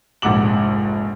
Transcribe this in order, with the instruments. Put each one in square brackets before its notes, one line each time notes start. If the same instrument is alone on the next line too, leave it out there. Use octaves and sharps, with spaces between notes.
[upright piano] F1 A#1 G#2 F#5 D6 F#7